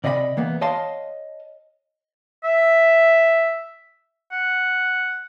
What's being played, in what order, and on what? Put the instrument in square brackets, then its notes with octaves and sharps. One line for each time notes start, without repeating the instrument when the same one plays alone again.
[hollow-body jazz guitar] C3 D5 D#5 F5 B5
E2 A#3 B3
C#5 D#5 F5 A5 C6
[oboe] E5
F#5